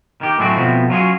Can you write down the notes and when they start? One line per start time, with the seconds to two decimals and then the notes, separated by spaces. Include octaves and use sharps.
0.21 D#3 G4
0.38 A2 F#3 G#3 A3 C4 F#4
0.57 B2 F3 A3 B3 C4
0.90 F#3 C#4 F4 F#4 G#4 C#5